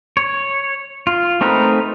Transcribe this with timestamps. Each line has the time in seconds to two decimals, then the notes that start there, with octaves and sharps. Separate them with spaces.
0.17 C#5
1.07 F4
1.41 A3 C4 D#4 A#4 B4